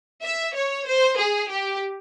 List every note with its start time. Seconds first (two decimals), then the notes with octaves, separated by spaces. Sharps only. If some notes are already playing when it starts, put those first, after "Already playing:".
0.22 E5
0.54 C#5
0.86 C5
1.18 G#4
1.49 G4